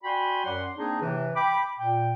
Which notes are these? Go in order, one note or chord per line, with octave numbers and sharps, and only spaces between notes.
F#4 D5 G5 G#5 B5 C6
F#2 F#3 D5 F#5 C6
A#3 C4 D4 D#4 G#4
A2 C3 E3
G5 B5 D6
A#2 G5